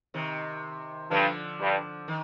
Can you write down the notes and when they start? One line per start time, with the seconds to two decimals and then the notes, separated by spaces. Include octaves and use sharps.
0.14 C3 D#3
1.11 G2 D3 F3
1.60 G2
2.08 D#3